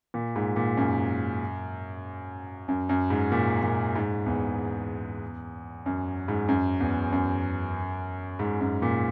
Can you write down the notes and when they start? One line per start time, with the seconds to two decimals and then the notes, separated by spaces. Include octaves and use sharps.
0.14 A#2
0.36 G#2
0.56 A#2
0.77 F#2
2.68 F#2
2.89 F#2
3.10 G#2
3.32 A#2
3.63 A#2
3.96 G#2
4.26 E2
5.86 F#2
6.28 G#2
6.48 F#2
6.81 E2
7.12 F#2
8.39 G#2
8.61 F#2
8.82 A#2